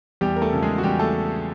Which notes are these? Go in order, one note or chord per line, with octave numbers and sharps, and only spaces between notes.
E2 G3 G4
A#4
A3 A4
C#3 F3
G#3 G#4
F#4
E2 G3 G4
A3 A4